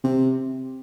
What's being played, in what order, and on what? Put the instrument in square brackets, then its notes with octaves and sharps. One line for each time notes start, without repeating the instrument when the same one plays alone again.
[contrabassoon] C3